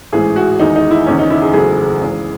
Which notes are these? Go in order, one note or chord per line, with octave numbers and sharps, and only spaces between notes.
A1 G#2 E3 G#4
F#4
E2 D#3 G#3 D#4
D#4
E4
F#1 E2 D#3 C#4
D#4
E4
G#4
F#1 E2 C#3 F#3 A3 G#4
G#1 F#2 E3